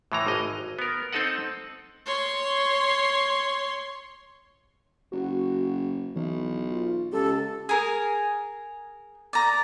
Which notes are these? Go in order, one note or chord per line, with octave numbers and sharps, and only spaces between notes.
A2 E3 A#5
G#1 D#5
B3 A#4
C4 D#4 A4 D#5 F#5
C#5 C6
F#1 F#4
B1 E3
F4
C#2 G4 A4
G#4 A#4
D5 A#5